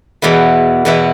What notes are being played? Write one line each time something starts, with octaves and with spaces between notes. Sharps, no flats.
E2 B2 B3 E4
E2 B2 B3 E4